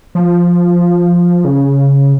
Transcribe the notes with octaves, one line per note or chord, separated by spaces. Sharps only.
F3
C#3